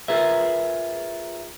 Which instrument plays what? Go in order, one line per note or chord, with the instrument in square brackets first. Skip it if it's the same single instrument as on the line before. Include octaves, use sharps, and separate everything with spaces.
[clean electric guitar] F4 G#4 A#4 B4 E5